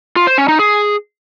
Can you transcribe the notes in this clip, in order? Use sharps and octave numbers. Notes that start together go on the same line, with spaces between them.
F4
C5
C#4
D#4
G#4